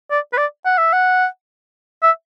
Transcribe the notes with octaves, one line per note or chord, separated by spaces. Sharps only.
D5
B4
D5
F#5
E5
F#5
E5